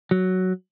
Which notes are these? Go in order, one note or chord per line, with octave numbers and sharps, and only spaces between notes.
F#3